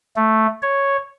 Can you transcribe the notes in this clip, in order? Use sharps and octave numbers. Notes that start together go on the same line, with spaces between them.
A3
C#5